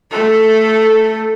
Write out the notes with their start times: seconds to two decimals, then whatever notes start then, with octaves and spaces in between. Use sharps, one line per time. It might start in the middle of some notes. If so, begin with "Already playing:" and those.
0.11 A3 A4